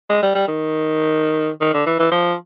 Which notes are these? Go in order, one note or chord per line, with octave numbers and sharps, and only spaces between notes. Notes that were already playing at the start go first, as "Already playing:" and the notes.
G#3
G3
G3
D#3
D#3
D3
E3
E3
F3